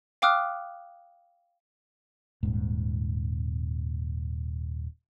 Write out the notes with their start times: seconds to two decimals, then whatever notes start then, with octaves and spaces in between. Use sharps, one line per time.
0.22 F5 G5 D6 D#6 F6 F#6
2.43 D#1 G#2